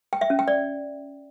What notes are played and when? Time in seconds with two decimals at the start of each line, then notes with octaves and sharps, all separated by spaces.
0.13 G5
0.21 E5
0.30 C#4
0.39 G5
0.48 D5